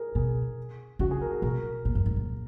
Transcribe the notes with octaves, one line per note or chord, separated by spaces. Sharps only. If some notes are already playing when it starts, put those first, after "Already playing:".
Already playing: G#4 A#4
B2 G#4
C#3 F#4
G#4
A#4
G#4
B2 A#4
A#2
F#2
G#2
A#2